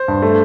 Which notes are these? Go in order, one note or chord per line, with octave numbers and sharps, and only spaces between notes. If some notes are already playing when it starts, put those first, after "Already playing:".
Already playing: C5
G2
A3